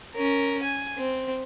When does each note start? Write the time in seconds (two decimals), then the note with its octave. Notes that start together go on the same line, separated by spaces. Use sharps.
0.14 C#4 A#4
0.63 G#5
0.98 C4